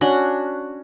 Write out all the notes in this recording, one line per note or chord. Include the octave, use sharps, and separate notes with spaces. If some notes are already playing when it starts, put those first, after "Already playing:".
C#4 D4 F#4 F#5